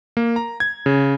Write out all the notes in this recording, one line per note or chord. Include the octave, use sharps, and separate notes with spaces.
A#3
A#5
G#6
C#3